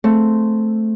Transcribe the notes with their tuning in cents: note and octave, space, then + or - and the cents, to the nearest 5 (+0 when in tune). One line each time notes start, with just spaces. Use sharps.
A3 +0 C4 +0 G#4 +0